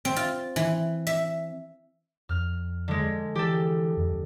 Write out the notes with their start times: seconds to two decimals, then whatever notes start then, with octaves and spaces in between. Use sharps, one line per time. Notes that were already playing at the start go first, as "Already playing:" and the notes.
0.05 C4
0.16 F4
0.56 E3
1.07 E5
2.29 F2 F6
2.88 D3 G#3
3.35 E3 G4 A4
3.97 F2